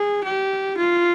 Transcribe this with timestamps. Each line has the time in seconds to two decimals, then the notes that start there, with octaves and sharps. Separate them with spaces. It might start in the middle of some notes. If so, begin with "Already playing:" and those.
Already playing: G#4
0.24 G4
0.77 F4